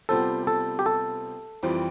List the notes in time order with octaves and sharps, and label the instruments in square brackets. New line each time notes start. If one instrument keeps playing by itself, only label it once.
[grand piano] C3 G3 B3 F4 C5 [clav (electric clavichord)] A4
[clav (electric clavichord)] A4
G4
A4
[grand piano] F2 E3 G3 C4 F4